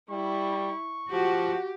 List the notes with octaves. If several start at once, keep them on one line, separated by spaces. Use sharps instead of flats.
G3 E4 C#6
F3 F#4 G4